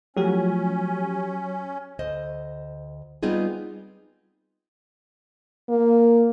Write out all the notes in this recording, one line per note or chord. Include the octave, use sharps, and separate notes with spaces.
F3 F#3 A3 C#4 G4
D2 C5 D#5
G3 B3 C4 D#4 F4 G#4
A#3